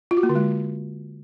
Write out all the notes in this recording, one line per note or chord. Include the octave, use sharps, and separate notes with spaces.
F4
F#4
A#3
D3
G#3